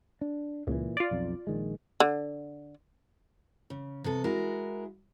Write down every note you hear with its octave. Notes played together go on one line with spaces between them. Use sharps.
D4
C#2 A#2 E3
F4 D5
B1 F2
A#1 D#3 G#3
D3
C#3
C3 B3 A4
G#3 E4 F#4 A#4